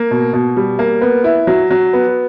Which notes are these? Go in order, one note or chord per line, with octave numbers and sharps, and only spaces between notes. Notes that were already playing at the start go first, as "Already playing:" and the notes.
Already playing: A#3
B2
B2
G3
A#3
B3
E4
F#3
F#3
B3